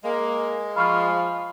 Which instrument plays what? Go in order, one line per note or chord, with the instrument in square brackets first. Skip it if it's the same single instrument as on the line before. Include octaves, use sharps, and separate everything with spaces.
[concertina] G#3 [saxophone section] A#3
[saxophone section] F3 [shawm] F5 [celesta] B5 C#6 F6